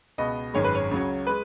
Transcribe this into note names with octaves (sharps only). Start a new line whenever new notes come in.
C#2 B2 B3 D#5
G#1 F#2 D#3 G#3 C#5
B4
C#5
C#2 C#3 F#3 C#4
G#3 B4